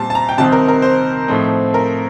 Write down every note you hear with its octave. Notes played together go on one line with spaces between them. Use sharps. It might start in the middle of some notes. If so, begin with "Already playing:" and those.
Already playing: A#2 G3 C4 A5
A5
A#5
G5
C2 C3 D#3 G3 C4 A5
A#4
A#4
C5
A2 F3 A3 C4 D#4
A#4